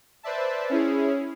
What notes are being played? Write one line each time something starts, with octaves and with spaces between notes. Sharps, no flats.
B4 C5 D5 E5 A5
C#4 E4 G#4